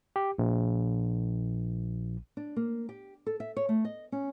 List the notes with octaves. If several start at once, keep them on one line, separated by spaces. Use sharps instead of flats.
G4
A#1
D4
A#3
G4
A4
E5
C#5
A3
D#5
C#4